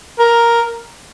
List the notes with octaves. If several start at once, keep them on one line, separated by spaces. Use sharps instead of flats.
A#4